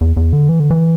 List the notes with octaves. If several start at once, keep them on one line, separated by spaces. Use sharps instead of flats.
E2
E2
D3
E3
D3
E3